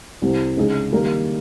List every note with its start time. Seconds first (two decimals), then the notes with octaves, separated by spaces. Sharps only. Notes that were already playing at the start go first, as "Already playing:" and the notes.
0.22 C2 C3 G3
0.57 C#3 G#3 D#4 G#4
0.92 D#3 G3 A#3 D#4 A#4